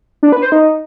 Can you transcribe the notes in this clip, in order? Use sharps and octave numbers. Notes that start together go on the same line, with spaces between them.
D4
B4
C5
D#4